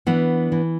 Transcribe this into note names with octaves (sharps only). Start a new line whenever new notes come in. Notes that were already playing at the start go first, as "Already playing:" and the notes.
E3 B3 D4
E3